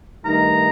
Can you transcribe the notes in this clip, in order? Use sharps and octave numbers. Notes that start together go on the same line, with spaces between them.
G2 D#3 A3 D#4 A#5